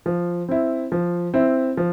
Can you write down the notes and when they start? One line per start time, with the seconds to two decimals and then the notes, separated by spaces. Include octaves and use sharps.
0.06 F3
0.49 C4 E4
0.92 F3
1.34 C4 E4
1.77 F3